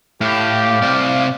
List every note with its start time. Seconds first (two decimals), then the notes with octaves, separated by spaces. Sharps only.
0.21 A2 G4 F5
0.82 C3 D5